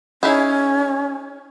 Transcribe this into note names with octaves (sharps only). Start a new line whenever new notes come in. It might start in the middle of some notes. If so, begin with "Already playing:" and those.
C#4 D#4 E4 G#4